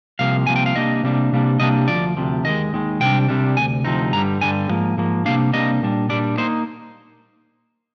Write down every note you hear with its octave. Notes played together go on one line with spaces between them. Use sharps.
C2 C3 F3 A#3 F5
C2 C3 F3 A#3 G#5
G5
F5
C3 G3 A#3 D4 D#5
C3 G3 A#3 D4
C3 G3 A#3 D4
C3 G3 A#3 D4 D#5
D2 C3 F3 D5
D2 C3 F3
D#2 D#3 G#3 D#5
D#2 D#3 G#3
C2 C3 G3 D4 G5
C2 C3 G3 D4
D2 C3 G#5
D2 C3 F3 C4 D#4
G2 D3 G3 A#5
G2 D3 G3 G#5
G#2 F3 A#3
G#2 F3 A#3
C3 G3 A#3 D4 F5
C3 G3 A#3 D4 D#5
A#2 G3 D4
A#2 G3 D4 D5
A#3 D#4 C5